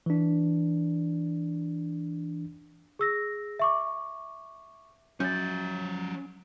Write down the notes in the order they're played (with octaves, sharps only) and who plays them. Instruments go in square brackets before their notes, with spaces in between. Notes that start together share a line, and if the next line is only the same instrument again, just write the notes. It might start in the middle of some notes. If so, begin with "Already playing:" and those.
[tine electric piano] E3 D4
[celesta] G#4 E6 A#6
E5 C#6 D6
[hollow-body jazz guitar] F#2 [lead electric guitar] F3 C#5 [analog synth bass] C#4 [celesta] G6 A6